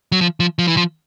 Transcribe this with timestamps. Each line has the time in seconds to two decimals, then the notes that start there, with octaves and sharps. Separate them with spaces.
0.12 F#3
0.21 F3
0.40 F3
0.59 F3
0.68 E3
0.77 F3